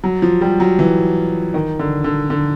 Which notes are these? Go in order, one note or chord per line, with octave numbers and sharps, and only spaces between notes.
F#3
F3
G3
F#3
E3
D#3
D3
D3
D3